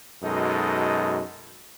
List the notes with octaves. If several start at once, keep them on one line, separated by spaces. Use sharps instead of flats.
F#2 B2 G#3 D#4 A4